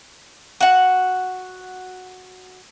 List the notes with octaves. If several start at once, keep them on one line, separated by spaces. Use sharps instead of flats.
F#4 F#5